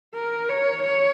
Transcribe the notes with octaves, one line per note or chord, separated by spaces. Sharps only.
A#4
C#5
C#5